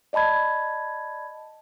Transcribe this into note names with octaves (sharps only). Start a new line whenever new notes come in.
D5 D#5 A5 B5 G#6